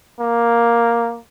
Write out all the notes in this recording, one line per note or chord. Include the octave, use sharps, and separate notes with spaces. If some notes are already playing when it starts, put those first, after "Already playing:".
A#3